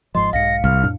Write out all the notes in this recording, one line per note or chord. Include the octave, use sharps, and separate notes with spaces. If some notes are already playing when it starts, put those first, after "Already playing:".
G#1 G#2 F3 D#5 C6
B1 G#2 F5 A#6 C#7
C2 F6
F2 A2 D4